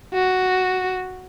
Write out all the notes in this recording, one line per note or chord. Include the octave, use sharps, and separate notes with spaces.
F#4